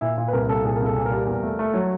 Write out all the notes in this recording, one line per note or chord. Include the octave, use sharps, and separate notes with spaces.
A#2 E4
A#2 F4
B4
C2 A#4
C2 A4
A#2 G#4
C2 A#4
A4
A#2
A#4
G3
E2
A3
A3
F#3